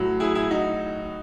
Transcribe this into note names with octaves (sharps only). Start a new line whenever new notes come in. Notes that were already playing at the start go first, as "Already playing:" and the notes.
Already playing: A2 F#3
E4 G#4
E4 G#4
D#4 F#4